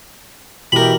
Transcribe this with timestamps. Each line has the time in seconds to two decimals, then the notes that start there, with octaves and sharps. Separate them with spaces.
0.72 B2 E3 G4 A#4 B5